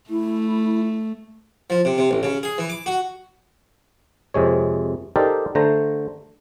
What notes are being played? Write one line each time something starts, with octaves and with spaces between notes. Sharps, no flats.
A3 E4
F3
C3
C3
A1
C#3
G#4
E3
D6
F#4
F2 C3 G#3 C#5
D#4 G4 A4 A#4 C5 D5
D3 A3 C5 A#5